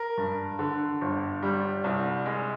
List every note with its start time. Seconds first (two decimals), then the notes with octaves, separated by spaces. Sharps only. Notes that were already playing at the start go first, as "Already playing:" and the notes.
Already playing: A#4
0.17 G2
0.59 D3
1.01 G1
1.43 G3
1.84 C2
2.26 G#3